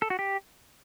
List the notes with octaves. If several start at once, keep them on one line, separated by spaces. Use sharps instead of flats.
A4
F#4
G4